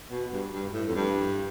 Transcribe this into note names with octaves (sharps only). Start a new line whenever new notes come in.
B2
G2
G2
A2
F2
G2